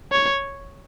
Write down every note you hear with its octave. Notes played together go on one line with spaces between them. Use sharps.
C#5